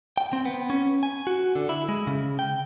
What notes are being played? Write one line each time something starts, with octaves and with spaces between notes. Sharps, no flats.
G5
C4
B3
C#4
G#5
F#4
D3
E4
G#3
C#3
G5